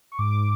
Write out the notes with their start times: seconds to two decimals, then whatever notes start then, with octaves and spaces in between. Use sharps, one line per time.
0.12 C#6
0.18 G#2 D6